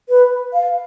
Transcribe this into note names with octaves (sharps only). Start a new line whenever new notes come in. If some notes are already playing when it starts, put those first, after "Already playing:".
B4
F5